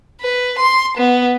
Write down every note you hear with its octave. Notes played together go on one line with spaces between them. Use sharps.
B4
C6
B3